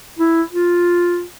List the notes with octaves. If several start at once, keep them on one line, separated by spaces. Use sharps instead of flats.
E4
F4